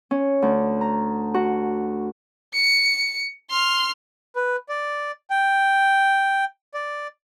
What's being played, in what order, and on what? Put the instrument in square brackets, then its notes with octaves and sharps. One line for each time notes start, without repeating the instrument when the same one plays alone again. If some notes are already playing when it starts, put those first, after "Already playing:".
[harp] C#4
D2
A#5
F#4
[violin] C#7
C6 F6
[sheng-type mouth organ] B4
D5
G5
D5